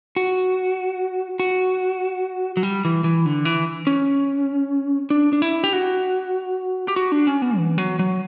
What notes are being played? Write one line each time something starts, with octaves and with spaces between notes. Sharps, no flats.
F#4
F#4
F#3
G3
E3
E3
D3
E3
C#4
D4
D4
E4
G4
F#4
G4
F#4
D4
C#4
B3
E3
F#3
F#3